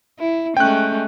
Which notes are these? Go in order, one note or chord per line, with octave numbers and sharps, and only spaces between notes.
E4
G#3 A3 C#4 G5 F#6